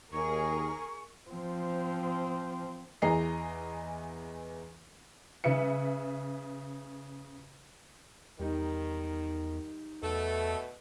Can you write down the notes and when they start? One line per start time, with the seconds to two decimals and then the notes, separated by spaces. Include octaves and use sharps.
0.13 D#2 G#4 A#4 C#6
1.30 F3 C4
3.02 E2 E3 G#4 D#5 A#5 C7
5.44 C#3 B4 E5 C#7
8.39 E2 D#3 G3 D#4
10.02 E2 B2 A3 A4